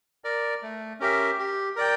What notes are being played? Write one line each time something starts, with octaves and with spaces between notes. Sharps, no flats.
A#4 D5
A3
C#4 G4 A#4 E5
G4
A#4 D5 G5